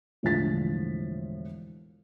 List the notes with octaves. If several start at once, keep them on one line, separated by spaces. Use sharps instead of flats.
E1 A2 D3 F3 A6 B6